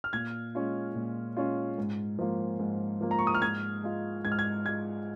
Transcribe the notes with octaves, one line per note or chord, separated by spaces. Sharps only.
F6
A#2 G#6
G#3 C#4 F4
A#2
G#3 C#4 F4
G#2
F3 A#3 F4
G#2
F3 A#3 F4
A#5
C#6
D#6
F6
G#2 G#6
G#3 F4
G#2 G#6
F6
G#6
G#3 F4 G#6